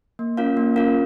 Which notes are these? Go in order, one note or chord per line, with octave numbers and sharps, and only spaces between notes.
A#3
C#4 F4 A#4 F5
A#3
C#4 F4 A#4 F5